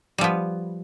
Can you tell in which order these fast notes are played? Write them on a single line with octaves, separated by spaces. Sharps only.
G3 F3 B3